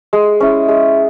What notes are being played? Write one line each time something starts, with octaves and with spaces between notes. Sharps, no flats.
G#3
C#4 E4
G#3